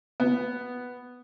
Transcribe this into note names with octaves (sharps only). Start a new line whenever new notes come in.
B3